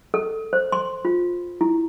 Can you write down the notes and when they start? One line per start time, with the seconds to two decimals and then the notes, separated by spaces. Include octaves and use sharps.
0.14 A4
0.53 C5
0.72 C6
1.05 F4
1.61 E4